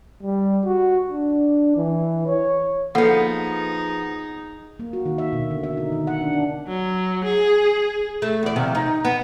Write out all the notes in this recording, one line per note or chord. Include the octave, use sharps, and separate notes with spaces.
G3
F#4
D4
E3
C#5
F3 A#3 B3 D#4 G#4 A4 F#5
A#3
F#4
D#3
E5
B2
D3
E5
D#4
D#3
F#5
D4
D4
F#3
G#4
A3
E2 D5
C3 D#3 F3
D#4
B3